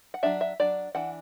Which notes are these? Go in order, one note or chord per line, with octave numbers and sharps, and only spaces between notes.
F#5
F#3 D4 E5
E5
F#3 D4 D5
E3 D4 F#5